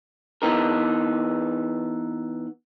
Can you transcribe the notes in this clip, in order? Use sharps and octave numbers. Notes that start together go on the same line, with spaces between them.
E3 B3 D#4 A#4